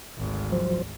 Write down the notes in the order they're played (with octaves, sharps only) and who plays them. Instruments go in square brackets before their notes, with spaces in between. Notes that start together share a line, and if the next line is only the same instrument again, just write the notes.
[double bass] G#1 D2
[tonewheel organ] F3 F#3 C5